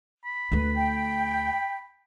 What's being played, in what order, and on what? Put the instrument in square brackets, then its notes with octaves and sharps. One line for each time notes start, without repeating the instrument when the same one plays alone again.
[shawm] B5
[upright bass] D2 A3 [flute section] B4
[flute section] G5